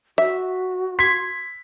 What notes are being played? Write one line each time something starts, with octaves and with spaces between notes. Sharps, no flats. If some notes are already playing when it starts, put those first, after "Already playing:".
F#4 E5
C6 G#6 B6